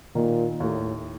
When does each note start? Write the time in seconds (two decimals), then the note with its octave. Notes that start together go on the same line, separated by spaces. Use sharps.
0.15 A#2 D#3
0.60 D#2 A2